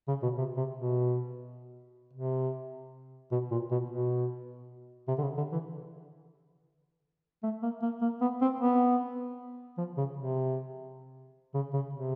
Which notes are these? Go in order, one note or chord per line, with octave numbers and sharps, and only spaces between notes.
C#3
B2
C3
C3
B2
C3
B2
A#2
B2
B2
C3
D3
C#3
D3
E3
A3
A#3
A#3
A#3
B3
C4
B3
F3
C#3
C3
C#3
C#3
C3